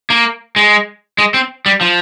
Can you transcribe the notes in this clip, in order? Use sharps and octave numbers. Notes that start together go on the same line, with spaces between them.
A#3
G#3
G#3
C4
G3
F3